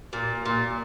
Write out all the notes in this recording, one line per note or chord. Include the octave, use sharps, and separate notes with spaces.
A#2
A#2